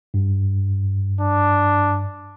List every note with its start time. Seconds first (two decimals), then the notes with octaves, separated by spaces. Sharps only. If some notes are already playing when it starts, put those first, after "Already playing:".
0.14 G2
1.21 D4